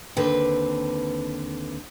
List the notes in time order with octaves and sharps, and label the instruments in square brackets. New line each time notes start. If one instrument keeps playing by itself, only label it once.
[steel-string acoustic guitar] D#2 D3 C4 B4